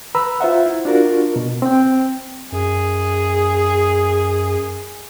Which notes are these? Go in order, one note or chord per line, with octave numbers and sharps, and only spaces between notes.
B4 A#5 B5 E6
F4 C5 E5 F#5
E4
D4 F4 F#4 A#4
B2
C4 G5
F#2 G#4